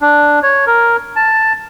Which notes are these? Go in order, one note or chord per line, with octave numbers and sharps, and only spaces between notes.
D4
C#5
A#4
A5